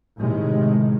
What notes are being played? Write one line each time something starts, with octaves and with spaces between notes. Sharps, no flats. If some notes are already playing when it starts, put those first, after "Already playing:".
A2 C3 D#3 G#3